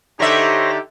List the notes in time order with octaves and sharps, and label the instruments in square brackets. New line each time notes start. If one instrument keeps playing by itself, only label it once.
[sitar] D3 D4 E5 [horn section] D#4 G4 [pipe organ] C5 C#5 A#6